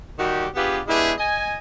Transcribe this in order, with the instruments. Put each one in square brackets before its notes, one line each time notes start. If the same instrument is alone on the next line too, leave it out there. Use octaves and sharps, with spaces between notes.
[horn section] D#3 G3 F#4 G4
B3 D4 F4 G4 G#4 B4
G#3 B3 D4 E4 G4 G#4
D#5 G#5